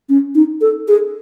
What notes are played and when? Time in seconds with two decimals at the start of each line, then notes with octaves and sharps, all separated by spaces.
0.09 C#4
0.35 D#4
0.61 A4
0.88 G#4